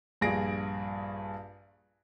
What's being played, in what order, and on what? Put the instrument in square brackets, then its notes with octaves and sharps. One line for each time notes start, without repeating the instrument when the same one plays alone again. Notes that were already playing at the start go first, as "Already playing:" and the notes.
[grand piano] A#1 G2 G#4 A#6 D7